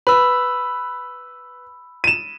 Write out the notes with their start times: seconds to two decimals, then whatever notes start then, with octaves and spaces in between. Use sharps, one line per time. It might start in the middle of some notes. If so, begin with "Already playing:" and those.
0.07 B4 B5 E6
2.04 D#7 E7